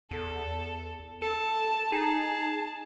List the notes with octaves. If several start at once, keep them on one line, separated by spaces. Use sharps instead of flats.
E2 A4
A4 A5
D#4 G#4 A5